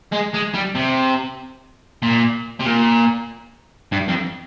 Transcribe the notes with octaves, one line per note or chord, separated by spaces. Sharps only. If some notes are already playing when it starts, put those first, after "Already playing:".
G#3
G#3
G3
C3
A#2
C3
A#2
G2
F2